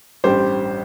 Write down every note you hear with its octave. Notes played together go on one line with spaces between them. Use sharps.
A1 G2 G3 G4 C5